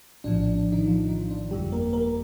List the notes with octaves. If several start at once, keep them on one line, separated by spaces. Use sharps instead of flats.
A#1 A2 F3 D4
D4
D4
D#3 D#4
F3 F4
D#3 D#4
D4
G1 F2 D3 G3 G4
A#3 A#4
A#3 A#4